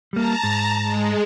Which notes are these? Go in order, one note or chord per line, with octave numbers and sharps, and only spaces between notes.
G3 A#3 A5 A#5
G#2
G#3